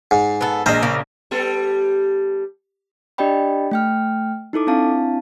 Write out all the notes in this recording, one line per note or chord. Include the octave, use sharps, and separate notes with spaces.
G#2
B3 A4
A#1 G#3 A#4 C5
C#3 A#3
G3 B3 A4
D4 G4 D5 D#5 G5 B5
A3 G5 F6
D#4 E4 A4 D6
C4 D4 E4 F5 A5